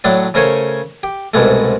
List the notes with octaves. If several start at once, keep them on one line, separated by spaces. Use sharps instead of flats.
A2 F#3 A3 D4
C#3 A3 A#4 C5 C#5 G#5
G4
C2 G#2 B2 G#3 A3